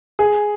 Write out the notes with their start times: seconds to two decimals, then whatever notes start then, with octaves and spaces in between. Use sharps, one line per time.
0.19 G#4